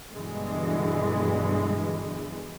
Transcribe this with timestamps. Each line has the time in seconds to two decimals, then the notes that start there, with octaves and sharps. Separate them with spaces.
0.15 G2 B2 D3 E3 G#3